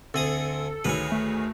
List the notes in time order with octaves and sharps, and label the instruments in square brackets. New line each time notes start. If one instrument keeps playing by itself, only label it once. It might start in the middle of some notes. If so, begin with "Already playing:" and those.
[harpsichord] D2 G#4 D#6 [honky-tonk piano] C4 [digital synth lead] A4
[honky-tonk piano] D2 D#3 G#4 [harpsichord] B4 C#5
[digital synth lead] A3